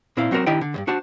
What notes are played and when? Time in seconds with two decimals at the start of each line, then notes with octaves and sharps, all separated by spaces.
0.17 A#2 C4 E4 C5 F5
0.31 F#3 C4 F#4 A4 A#4 C5
0.46 D#3 D4 E4 G4 D#5 G5
0.61 D3
0.74 D2 G2
0.87 D4 F#4 C5 A5